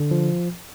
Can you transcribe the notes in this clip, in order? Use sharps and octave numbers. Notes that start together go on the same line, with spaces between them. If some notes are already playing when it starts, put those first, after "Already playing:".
Already playing: D3
F3